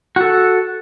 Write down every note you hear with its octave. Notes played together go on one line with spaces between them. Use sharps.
F#4 A4